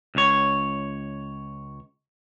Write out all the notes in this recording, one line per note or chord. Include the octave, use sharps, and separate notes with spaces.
C#2 C#5